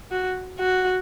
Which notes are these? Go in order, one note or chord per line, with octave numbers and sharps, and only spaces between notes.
F#4
F#4